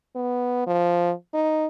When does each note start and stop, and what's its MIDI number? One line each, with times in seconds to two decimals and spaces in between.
0.16 0.66 59
0.67 1.12 53
1.34 1.67 63